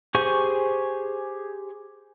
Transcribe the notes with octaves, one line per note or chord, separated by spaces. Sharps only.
G4 G#4 C5 G#5 C#6